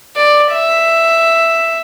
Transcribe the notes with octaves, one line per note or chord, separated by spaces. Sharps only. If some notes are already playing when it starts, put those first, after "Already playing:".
D5
E5